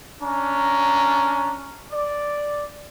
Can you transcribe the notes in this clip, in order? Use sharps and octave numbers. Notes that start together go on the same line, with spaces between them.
C#4 D4 A#5
D5